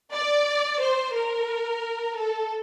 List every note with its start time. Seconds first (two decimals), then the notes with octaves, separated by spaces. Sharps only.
0.13 D5
0.80 C5
1.14 A#4
2.15 A4